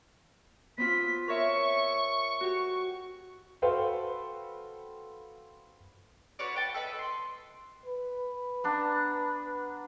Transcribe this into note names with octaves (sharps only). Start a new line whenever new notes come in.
B3 C4 F4 B6
A#4 C#5 E5 C#6
F#4 G4
F#4 A4 B4 C5 F5 G5
F#4 B4 C#5 D5
B4 G5 A5
A4 B4 D#5 B5
C6
B4
B3 D4 A#5